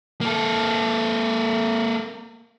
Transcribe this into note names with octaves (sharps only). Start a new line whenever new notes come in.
A#3 A4